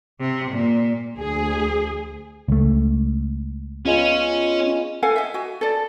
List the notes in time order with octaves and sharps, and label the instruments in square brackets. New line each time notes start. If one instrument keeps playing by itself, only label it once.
[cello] C3
A#2
[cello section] D2 G#4
[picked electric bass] C#2 A3
[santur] G#3 B3 F4 [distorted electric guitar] C#4
[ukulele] A4 F5 F#5 G#5
D#5 E5
F#4 G#5
A4 D5